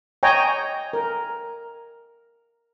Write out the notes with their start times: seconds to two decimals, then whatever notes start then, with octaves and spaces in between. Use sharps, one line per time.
0.23 C#5 D#5 G5 G#5 A#5
0.93 A#4